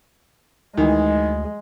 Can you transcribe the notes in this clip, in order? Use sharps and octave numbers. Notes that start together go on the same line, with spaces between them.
D2 D#3 E3 G#3